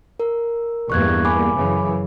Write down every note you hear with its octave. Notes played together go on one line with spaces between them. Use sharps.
A#4
E2 G2 A#3 C#6 F#6 G#6
G#5 B5 D6
F#2 C#3 E3